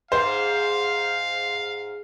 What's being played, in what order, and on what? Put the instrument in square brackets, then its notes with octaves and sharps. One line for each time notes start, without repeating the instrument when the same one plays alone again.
[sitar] G#2 [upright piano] C5 [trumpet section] F5